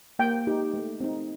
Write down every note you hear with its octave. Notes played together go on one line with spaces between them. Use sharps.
A#3 G5
D#4 G4
A3
C4 D#4